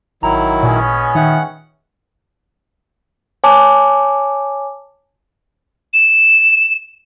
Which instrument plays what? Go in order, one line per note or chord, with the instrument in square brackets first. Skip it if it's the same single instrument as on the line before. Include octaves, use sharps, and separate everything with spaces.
[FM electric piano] A1 [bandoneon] D#3 F#3 E4 [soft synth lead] A#5
[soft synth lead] A#2 [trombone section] G#3 B3 C#4
[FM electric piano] D#3 E5 G5 [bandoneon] F#5
[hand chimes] C#5 G#5 A5 D6
[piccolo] E7